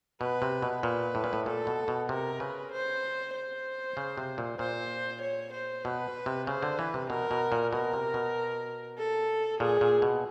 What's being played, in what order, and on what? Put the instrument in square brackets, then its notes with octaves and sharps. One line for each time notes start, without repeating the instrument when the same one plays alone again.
[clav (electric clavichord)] B2 [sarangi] B4
[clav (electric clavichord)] C3
B2
[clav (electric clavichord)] A#2 [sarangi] B4
[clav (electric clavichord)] A2
A#2
A2
[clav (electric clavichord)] A#2 [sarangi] A4
[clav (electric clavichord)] B2
B2
[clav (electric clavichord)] C3 [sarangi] A#4
[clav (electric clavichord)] C#3 [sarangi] B4
[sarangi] C5
C5
[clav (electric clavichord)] C#3
C3
A#2
[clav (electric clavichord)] A#2 [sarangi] C5
[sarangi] C#5
C5
[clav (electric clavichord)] B2 [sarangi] B4
[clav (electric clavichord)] C3
[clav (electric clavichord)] C#3 [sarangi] C5
[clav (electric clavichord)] D3
[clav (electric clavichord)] E3 [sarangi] B4
[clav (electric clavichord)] C3
[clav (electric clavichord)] B2 [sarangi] A#4
[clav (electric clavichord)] B2
A#2
[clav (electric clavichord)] B2 [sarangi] A#4
[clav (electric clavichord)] C3
B2
[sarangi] A4
[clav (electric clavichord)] A#2 [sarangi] G#4
[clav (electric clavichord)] A#2
B2